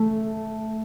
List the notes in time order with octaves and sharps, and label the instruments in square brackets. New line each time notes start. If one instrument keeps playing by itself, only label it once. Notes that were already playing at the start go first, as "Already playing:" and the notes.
Already playing: [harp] A3